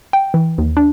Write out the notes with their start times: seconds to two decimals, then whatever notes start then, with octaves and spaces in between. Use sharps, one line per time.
0.13 G5
0.34 E3
0.58 D#2
0.77 D4